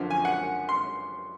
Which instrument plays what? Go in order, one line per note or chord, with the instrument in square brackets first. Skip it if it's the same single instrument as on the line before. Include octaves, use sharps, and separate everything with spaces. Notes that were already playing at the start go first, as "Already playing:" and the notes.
Already playing: [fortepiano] F#2 D3 F3
G#5
F#5
C6